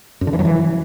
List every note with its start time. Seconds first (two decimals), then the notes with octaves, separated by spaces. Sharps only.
0.21 F#2
0.27 D3
0.33 E3
0.39 F#3
0.45 E3